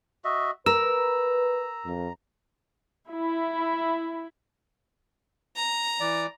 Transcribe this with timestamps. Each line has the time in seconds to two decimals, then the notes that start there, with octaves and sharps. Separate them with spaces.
0.25 F#4 D#5 E5
0.66 A#4 B4 A#5 E6
1.85 F2
3.09 E4
5.56 A#5
6.00 E3 D5